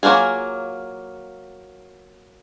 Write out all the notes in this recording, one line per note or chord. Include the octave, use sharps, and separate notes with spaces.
F#3 A#3 C#4 F4 G#4